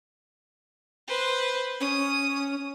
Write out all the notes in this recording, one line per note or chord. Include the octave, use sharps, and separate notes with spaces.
B4 C5
C#4 D#6